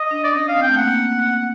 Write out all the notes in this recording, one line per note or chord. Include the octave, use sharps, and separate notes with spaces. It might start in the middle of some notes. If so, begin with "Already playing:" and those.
Already playing: D#5
D4
D5
C#4 D#5
F5
C4
G5
A3
A#3 F#5